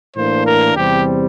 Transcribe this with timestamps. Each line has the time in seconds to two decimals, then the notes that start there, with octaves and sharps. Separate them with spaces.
0.15 A2 E3 A#3 D4 C5
0.45 A#4
0.76 E2 C3 G3 C4 G4